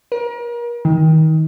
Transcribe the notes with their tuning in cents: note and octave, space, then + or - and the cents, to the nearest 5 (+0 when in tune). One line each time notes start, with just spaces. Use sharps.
A#4 +35
D#3 +25